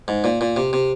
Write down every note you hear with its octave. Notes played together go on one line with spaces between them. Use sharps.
G#2
A#2
A#2
C3
C3